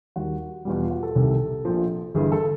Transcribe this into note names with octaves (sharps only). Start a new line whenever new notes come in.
D#2 D#3 G3 F#4
E2 B2 G3 F4
F4
F#4
A4
C2 C3 D#3
A#1 A#2 F3
G1 G2 E3 G#4
A4